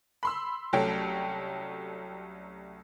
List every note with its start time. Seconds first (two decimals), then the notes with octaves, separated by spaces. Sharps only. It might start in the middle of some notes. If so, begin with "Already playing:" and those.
0.23 B5 C6 E6
0.73 C2 F#3 A3 C#4 G5